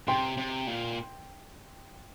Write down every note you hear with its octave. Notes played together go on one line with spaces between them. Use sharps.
C3 G5 C6
C3
A#2